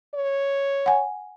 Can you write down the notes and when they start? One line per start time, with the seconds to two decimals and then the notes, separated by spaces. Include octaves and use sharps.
0.15 C#5
0.86 F#5 G#5